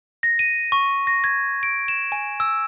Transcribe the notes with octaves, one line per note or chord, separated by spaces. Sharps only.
A#6
D#7
C#6
A#6
G#6
D7
E7
G#5
E6